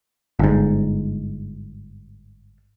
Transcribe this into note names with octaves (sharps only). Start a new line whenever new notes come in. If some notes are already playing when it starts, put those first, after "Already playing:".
G1 G#2